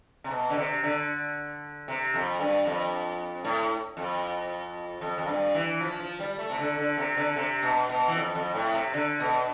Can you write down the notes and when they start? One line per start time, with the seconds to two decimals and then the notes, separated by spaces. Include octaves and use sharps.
0.24 C3
0.31 B2
0.50 D3
0.57 C3
0.83 D3
1.88 C3
2.14 F2
2.40 G2
2.66 F2
3.45 A2
3.97 F2
5.01 F2
5.18 F2
5.28 G2
5.54 E3
5.80 F3
6.00 F3
6.20 G3
6.39 A3
6.50 C3
6.59 D3
6.78 D3
6.98 C3
7.17 D3
7.36 C3
7.63 B2
7.89 B2
8.08 E3
8.15 F2
8.35 F2
8.55 A2
8.74 C3
8.93 D3
9.20 B2